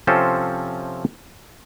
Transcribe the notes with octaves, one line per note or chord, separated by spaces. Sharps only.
C3 F3 C4 C#4 A4 C5